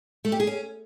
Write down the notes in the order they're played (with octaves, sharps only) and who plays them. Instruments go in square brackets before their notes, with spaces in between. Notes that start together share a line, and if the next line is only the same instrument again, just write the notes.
[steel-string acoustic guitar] A3
G4
G#4
C#4